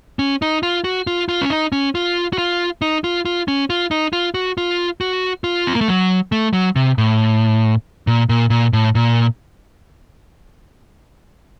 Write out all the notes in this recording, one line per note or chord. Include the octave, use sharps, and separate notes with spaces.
C#4
D#4
F4
F#4
F4
F4
C#4
D#4
C#4
F4
F#4
F4
D#4
F4
F4
C#4
F4
D#4
F4
F#4
F4
F#4
F4
C4
A#3
A3
F#3
A3
F#3
C3
A2
A#2
A#2
A#2
A2
A#2